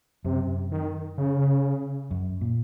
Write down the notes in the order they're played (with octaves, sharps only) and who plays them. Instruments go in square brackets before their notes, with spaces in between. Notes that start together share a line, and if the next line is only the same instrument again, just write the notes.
[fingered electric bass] F#2 [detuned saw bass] C3
[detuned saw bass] D#3
C#3
[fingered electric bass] F#2
A#2